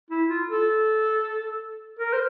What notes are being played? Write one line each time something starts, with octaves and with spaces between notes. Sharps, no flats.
E4
F4
A4
A#4
C5